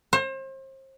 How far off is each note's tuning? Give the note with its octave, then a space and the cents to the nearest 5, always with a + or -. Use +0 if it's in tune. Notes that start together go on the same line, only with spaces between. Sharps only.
C5 +35